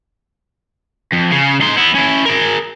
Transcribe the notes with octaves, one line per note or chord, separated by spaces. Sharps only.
F2
C#3
D#4 C6
B3 E4
C#4 E4
G#4 A#4